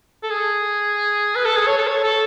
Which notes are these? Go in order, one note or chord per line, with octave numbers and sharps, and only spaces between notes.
A4
G#4
B4
A4
G#4
C#5
A4
C#5
A4